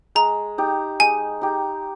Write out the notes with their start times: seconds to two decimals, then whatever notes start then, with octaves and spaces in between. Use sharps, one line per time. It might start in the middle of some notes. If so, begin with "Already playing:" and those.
0.15 G#3 A#5
0.58 D#4 G4
1.00 G#3 G#5
1.41 D#4 G4